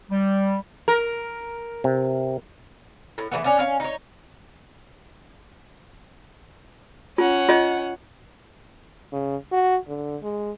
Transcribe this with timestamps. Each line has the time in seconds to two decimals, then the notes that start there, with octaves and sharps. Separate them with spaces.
0.10 G3
0.88 A#4
1.84 C3
3.18 A2
3.32 E3 G3 A3 B3
3.44 C#4 D4
3.59 C#4 F5
3.80 D#4 C#5
7.18 C#4 F4 F#5
7.49 F4 D#5
9.12 C#3
9.52 F#4
9.88 D3
10.23 G#3